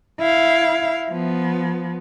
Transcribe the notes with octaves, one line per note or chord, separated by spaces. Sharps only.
E4 F5
F3 B3